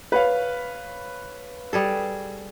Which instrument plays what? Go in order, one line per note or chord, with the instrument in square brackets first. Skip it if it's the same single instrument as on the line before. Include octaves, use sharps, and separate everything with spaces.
[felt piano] B4 C#5 F5
[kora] G3 G#4 A4